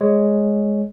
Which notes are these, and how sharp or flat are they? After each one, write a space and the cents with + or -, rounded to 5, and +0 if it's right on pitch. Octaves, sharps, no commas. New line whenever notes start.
G#3 +0 C#5 +0